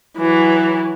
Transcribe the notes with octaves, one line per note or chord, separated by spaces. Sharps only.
E3 F#3